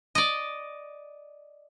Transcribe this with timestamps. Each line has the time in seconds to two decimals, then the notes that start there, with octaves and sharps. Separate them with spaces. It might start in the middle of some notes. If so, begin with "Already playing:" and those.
0.15 D5 D#5